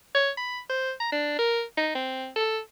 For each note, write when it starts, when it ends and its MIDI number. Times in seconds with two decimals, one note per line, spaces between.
0.15 0.30 73
0.37 0.59 83
0.69 0.92 72
1.00 1.12 82
1.12 1.36 62
1.39 1.62 70
1.77 1.94 63
1.95 2.29 60
2.36 2.59 69